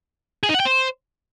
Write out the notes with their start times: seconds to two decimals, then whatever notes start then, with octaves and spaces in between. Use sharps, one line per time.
0.43 G#4
0.49 D#4
0.54 F#5
0.60 G5
0.65 C5